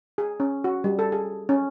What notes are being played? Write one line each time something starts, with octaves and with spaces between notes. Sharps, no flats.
G#4
C#4
F#4
G3
A4
G#4
C#4